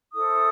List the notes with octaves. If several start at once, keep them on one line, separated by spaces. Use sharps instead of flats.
E4 A4 C5 D#6